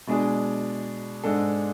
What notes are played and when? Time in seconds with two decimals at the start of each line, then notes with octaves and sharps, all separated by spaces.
0.07 B2 G#3 D4 G#4
1.24 G#2 G#3 D4 A4